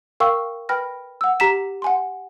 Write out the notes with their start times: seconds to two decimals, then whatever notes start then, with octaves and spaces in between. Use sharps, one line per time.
0.20 A#4 F5 G5 C#6 E6
0.69 B4 G5 B5 F6 A#6
1.21 F#5 E6
1.40 G4 A#5 B6 E7
1.82 F#5 G#5 C6